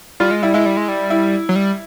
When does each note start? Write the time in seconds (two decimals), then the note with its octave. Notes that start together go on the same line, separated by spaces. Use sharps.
0.20 G3 F4
0.31 G#3
0.42 G3 E4
0.54 G#3 E4
0.66 G3
0.77 G#3
0.88 G3
1.10 E4
1.49 F#3
1.56 G3